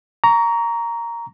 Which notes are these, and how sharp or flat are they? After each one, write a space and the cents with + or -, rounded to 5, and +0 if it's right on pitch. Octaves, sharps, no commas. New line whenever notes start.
A#5 +0 C#6 +30